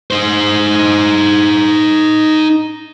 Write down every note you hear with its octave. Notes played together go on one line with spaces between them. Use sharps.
D#4 C5